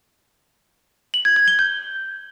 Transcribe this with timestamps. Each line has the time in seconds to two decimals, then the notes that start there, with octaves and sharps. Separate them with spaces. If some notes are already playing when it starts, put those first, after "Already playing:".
1.14 F#7
1.25 G#6
1.36 G#6
1.48 G7
1.59 G6